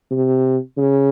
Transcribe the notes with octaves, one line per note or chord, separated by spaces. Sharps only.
C3
C#3